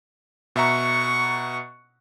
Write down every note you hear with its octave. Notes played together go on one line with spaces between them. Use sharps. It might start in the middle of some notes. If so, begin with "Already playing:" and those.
B2 E5 F#5 A#5 C#6